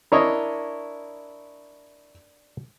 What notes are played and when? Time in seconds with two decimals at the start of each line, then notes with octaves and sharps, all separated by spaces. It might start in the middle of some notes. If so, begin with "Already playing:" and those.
0.12 D4 E4 A#4 C#5 D#5